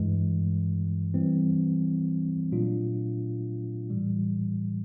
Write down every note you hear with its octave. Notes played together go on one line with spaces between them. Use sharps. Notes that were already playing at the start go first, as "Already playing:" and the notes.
Already playing: G2 E3 G#3
E3 G3 C4
A#2 F#3 A3 D4 F4
A2 E3 G3